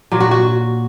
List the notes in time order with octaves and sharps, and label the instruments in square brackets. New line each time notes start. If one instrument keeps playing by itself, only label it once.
[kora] A#2 F#3
F#4
F#4